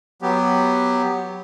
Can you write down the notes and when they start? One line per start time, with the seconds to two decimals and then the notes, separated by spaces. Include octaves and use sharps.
0.22 F#3 B3 G4